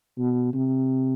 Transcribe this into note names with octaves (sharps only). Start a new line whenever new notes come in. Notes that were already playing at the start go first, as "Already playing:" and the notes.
B2
C3